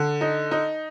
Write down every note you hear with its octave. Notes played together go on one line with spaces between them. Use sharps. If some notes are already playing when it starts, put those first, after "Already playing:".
Already playing: D3
D#4
D#4